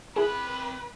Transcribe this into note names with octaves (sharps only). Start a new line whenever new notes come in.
C4 E4 G#4 B4 B5